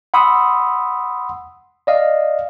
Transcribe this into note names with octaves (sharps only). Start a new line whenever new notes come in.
F#5 B5 C6 D#6 E6
D5 D#5 F5